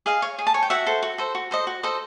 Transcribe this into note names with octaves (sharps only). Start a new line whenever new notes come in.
G#4 D#5 F5
C#5
G#4
A5
C#5 G#5
G5
F#4 E5 F#5
A4 C5
F#4
A4 C5
F#4
A4 C5 D#5
F#4
A4 C5 D#5